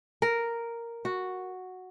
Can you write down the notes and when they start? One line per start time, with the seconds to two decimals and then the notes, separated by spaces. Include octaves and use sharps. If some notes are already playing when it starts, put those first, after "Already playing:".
0.22 A#4
1.05 F#4